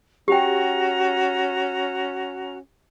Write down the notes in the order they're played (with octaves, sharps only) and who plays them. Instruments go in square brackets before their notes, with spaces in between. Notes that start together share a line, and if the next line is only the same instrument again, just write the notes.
[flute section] C#4 F#4 A#5 [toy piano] G4 G5